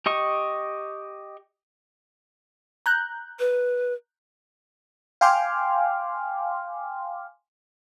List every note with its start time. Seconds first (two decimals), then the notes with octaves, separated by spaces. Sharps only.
0.06 G4 D#5 C#6
2.86 A#5 F#6 G6
3.39 B4
5.21 F5 G5 G#5 C6 D6 F6